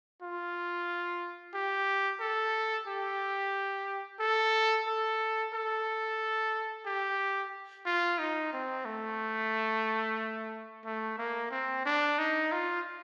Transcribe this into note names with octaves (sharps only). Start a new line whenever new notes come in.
F4
G4
A4
G4
A4
A4
A4
G4
F4
D#4
C4
A3
A3
A#3
C4
D4
D#4
F4